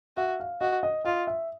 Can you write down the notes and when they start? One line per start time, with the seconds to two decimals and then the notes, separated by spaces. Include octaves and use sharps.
0.17 F#4 E5
0.40 F5
0.61 F#4 D#5
0.83 D#5
1.05 F4 D#5
1.27 E5